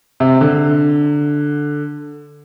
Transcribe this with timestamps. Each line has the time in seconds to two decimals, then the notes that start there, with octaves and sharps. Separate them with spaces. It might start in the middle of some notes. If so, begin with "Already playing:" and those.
0.20 C3
0.41 D3